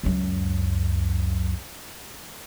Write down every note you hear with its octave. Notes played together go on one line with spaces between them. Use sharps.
C#2 F#2